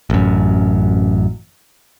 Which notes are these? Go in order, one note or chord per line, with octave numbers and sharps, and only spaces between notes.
A1 F#2